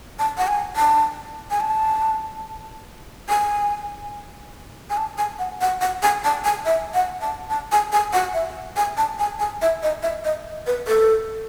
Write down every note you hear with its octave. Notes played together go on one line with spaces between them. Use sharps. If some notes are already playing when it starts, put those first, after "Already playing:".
A5
F#5
G#5
A5
G#5
A5
G#5
G#5
A5
G#5
F#5
F#5
F#5
G#5
A5
G#5
E5
F#5
A5
A5
G#5
G#5
F#5
E5
G#5
A5
G#5
G#5
E5
D#5
E5
D#5
B4
A4